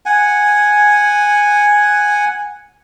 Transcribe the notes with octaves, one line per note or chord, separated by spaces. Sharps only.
F#5 G#5